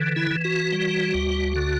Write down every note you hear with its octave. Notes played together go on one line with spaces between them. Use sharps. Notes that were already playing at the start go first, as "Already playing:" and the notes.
Already playing: D3 E3
E4
E3
F#4
G3
D2
D3